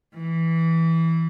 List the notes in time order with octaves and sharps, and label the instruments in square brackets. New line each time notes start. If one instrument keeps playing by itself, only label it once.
[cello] E3